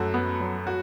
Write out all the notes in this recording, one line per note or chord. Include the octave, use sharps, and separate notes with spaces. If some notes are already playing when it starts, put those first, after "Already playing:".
Already playing: F#2 A3 F#4 A4
B3
F#3
F#4